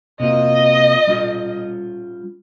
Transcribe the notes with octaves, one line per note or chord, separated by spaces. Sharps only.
C3 A#3 F4 D#5
G3 C#4 F4